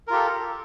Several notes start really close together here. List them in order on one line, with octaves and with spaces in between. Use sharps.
A#4 F4 G4 A4